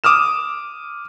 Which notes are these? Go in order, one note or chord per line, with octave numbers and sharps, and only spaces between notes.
D6 D#6 F6 E7